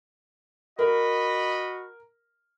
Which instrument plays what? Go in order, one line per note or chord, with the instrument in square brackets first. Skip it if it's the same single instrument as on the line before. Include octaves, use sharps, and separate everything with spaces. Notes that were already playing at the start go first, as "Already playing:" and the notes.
[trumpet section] F#4 D#5 B5 [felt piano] A#4